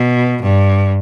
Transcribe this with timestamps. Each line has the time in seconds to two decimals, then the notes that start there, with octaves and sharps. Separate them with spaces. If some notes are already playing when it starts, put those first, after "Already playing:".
Already playing: B2
0.42 G2